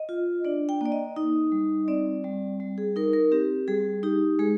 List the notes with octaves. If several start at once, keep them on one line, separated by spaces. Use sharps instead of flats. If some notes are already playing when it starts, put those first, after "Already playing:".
Already playing: D#5
F4
D4 D5
G5
A#3 D5
D#5
D#4 D#5
G3
C4 D5
G3
G3
G#4
D#4 A#4
A#4
C4 G4
G3 G#4
D#4 G4
G#3 G#4